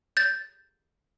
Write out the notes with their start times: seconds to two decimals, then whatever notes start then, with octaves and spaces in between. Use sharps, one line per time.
0.17 G6 A6